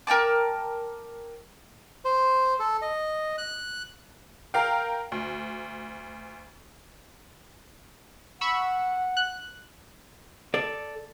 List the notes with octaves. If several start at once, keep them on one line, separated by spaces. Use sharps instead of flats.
A#4 G5 A5 D6
C5
A4
D#5
F#6
A#4 F5 G5
D2
F#5 B5 C#6 E6
F#6
A4 D5